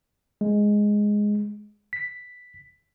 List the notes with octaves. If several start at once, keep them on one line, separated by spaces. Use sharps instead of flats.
G#3
B6